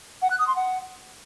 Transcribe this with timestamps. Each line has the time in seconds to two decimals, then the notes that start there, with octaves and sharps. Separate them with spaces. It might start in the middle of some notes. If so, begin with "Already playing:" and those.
0.22 F#5
0.30 F#6
0.39 D#6
0.47 C6
0.56 F#5